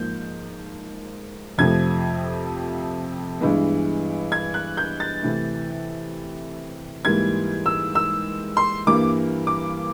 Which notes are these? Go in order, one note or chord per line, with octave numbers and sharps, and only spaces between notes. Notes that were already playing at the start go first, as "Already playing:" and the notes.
Already playing: G#2 F3 A#3 G6
F2 C3 F3 A3 G#6
G2 E3 G#3 B3
G#6
F#6
G6
A6
C3 E3 A3
G#2 E3 G3 A#3 G#6
E6
E6
C6
G2 E3 G3 A#3 D6
D6